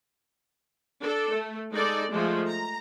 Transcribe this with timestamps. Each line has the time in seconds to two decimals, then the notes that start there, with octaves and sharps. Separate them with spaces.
1.01 D4 A4
1.34 A3
1.73 G#3 D#4 A4 D5
2.12 F3 G#3 A3
2.47 A#5